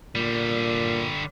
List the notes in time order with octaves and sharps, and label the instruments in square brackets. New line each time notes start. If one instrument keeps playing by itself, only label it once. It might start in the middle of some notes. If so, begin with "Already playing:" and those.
[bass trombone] A#2 [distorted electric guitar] D3 G3